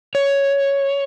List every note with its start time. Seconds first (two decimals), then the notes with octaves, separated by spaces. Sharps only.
0.15 C#5